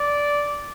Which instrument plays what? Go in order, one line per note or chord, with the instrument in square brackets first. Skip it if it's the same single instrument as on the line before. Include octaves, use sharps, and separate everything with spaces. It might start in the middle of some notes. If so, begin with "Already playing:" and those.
Already playing: [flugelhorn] D5